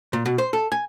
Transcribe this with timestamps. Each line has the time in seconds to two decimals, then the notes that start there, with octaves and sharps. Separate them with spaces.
0.13 A#2
0.26 B2
0.38 C5
0.53 A4
0.72 G#5